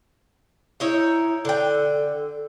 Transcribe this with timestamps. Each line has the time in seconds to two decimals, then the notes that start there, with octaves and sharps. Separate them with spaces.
0.80 D#4 E4 C#5
1.45 D3 A4 G5